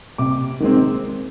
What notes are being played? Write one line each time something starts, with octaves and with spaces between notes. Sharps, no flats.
C3 D6
D#3 G#3 C4